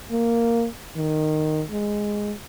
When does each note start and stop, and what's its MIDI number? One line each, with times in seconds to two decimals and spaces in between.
0.11 0.66 58
0.97 1.64 51
1.70 2.33 56